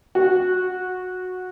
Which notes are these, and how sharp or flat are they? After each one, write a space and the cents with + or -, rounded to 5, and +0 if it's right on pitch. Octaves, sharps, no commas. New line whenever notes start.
F#4 -10